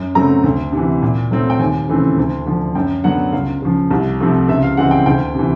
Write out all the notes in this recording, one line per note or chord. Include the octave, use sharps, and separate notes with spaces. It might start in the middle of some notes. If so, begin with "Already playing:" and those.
Already playing: F#2
C#3 F#3 A3 C4 A#5
D2
C3 E3
A#2
F#3 A3 C4
G5
D#2 G#5
C#3 E3 A3 C4
D2
D3 F3
F#2 G5
D3 F#3 B3 F#5
C#2 F5
C#3 F3
C2
C3 F3 A3 C4
C#2 E5
F5
C#3 E3 G#3 C4 F#5
G5
D2 G5
C3 E3